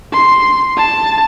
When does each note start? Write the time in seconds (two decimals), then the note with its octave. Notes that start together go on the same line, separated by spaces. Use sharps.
0.13 C6
0.76 A5